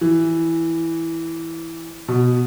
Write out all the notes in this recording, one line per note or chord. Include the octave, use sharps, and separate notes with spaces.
E3
B2